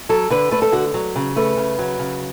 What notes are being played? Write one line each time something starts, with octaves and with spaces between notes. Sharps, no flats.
F#3 A4
D3 B4
A3 B4
A4
D3 F#4
F#3
C#3
A3 B4
C#3
F#3
C#3